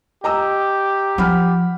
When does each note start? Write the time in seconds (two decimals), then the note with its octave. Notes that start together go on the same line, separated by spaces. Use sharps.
0.24 G4 D#5 A#5 E6
1.18 F3 F#5 B5 F6